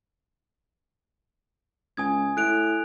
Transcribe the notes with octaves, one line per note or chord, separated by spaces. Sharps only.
C#2 G#5 D#6 G#6
A2 F#6 D7 F7